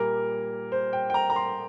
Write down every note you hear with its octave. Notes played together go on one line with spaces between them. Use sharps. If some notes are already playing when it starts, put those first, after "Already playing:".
Already playing: A#2 G3 A#3 A#4
C5
G5
G5
A#5
A#5
C6